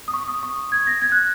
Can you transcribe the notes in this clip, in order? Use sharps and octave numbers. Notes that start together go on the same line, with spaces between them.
D#6
C#6
D#6
C#6
G#6
A#6
G#6
F#6